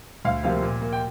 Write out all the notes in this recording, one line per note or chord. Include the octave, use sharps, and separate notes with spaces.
D2 F5
C3 F3 A#3 F5
A#2
A#3
G5